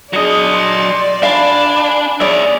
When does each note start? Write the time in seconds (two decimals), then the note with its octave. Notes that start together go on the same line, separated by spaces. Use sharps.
0.13 F#3 D4 G#4 D5 D#5
0.54 C6
1.23 D4 F5 G#5 B5
2.20 G#4 C#5 D5 E5